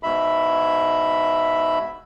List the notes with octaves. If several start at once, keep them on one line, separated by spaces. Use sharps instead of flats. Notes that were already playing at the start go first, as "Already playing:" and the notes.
G#2 B2 E5 B5